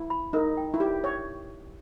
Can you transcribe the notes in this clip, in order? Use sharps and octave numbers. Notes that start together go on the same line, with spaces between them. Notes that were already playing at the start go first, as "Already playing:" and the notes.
Already playing: E4
B5
D#4 A#4
G5
E4
G4 E5
C#5 E5